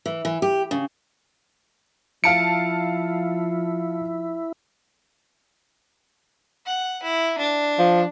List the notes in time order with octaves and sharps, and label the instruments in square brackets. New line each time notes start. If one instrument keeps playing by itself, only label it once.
[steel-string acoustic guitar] E3
E3
G4
C#3
[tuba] F3 [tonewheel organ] E4 [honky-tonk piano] F5 A5 D7 [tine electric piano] C#7
[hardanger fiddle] F#5
E4
D4
[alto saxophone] F3